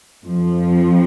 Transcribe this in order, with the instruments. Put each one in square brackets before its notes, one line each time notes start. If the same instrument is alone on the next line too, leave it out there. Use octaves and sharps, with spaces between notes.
[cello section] F2 F3